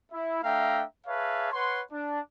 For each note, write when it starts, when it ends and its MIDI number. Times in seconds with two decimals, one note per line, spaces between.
0.12 0.40 64
0.43 0.83 57
0.43 0.83 62
0.43 0.83 76
0.43 0.83 77
0.43 0.83 79
0.43 0.83 82
1.07 1.50 68
1.07 1.50 71
1.07 1.50 73
1.07 1.50 76
1.07 1.50 77
1.07 1.50 81
1.53 1.82 71
1.53 1.82 73
1.53 1.82 78
1.53 1.82 84
1.91 2.19 62